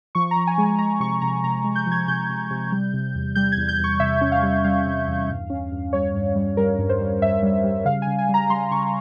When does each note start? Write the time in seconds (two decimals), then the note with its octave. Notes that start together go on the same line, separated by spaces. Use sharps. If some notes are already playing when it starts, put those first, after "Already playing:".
0.15 F3 C#6
0.31 A#5
0.36 F3
0.47 G#5
0.58 G#3 G#5
0.79 G#3 A#5
1.00 C3 C#6
1.22 C3 A#5
1.44 C3 A#5
1.64 G#3
1.75 G6
1.86 F3
1.92 G#6
2.08 C3 G6
2.29 C3
2.51 C3
2.72 G3
2.94 C3
3.15 E2
3.35 G3 G6
3.52 G#6
3.57 E2
3.69 G6
3.79 E2
3.84 C#6
4.00 C3 E5
4.21 C#4
4.32 F5
4.43 G3
4.65 G3 F5
4.86 C3
5.08 E2
5.29 G2
5.50 C#4
5.72 G2
5.93 G3 C#5
6.14 G2
6.36 G3
6.57 G3 A#4
6.79 G2
6.89 C5
7.01 G3
7.22 G2 E5
7.43 G3
7.64 G3
7.85 C#3 F5
8.02 C#3 G#5
8.19 G#5
8.29 G3 A#5
8.50 G3 C6
8.71 C#3 C#6